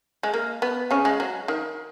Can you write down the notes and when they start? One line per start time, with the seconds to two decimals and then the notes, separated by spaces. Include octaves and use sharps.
0.23 G#3
0.34 A#3
0.62 B3
0.91 C#3 C#4
1.05 G#3
1.20 F#3
1.48 D#3